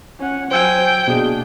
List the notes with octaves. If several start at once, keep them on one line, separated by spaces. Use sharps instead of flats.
C#4 F#5
F#3 C5 G5 G#5 E6 G#6
B2 A#3 D4 G#4